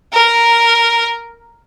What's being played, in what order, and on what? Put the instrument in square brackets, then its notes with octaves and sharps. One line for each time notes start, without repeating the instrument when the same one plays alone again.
[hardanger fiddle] A#4